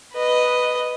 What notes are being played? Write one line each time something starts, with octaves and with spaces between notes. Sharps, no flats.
B4 D#5